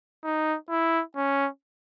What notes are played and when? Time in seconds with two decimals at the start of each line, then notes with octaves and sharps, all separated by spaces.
0.24 D#4
0.70 E4
1.15 C#4